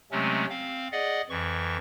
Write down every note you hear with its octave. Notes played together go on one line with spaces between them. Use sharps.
C3 F#3 G#3 A3 C4 C#4
C4 F5
G#4 D5 D#5 F#5
F2 E3 C#6